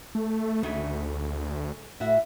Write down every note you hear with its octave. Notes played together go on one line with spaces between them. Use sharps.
A3
D2 G#2 C#3 A3
A2 E4 F#4 E5